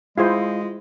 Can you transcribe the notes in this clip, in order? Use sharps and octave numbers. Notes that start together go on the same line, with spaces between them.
G#3 E4 F4 G#4 C5